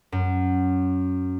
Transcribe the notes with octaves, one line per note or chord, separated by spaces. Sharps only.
F#2